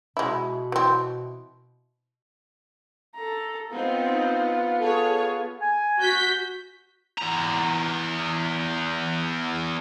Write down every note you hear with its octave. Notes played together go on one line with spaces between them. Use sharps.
B2 G#3 E4
E3 C4
A4 A#5
B3 C4 D#4 F4
G#4 A4 C#5
G#5
F#4 G6 B6
E2 A#5